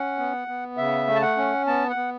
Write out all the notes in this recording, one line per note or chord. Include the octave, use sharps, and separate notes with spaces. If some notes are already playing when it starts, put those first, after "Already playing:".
Already playing: C#4 F#5
B3
B3
C#3 E5
A3
A5
F#5
C#4
B3 A5
F#5
B3